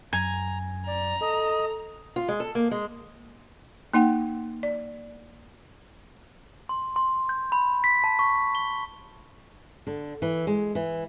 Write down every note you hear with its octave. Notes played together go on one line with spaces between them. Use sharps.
F#2 G#5 A#5
D5 A#5
A4 D#5
F4
G#3
A4
A#3
G#3
A#3 D#4 F#5 G5
D5
C6
C6
G6
B5
B6
A5
C#6
G7
D3
E3
G#3
E3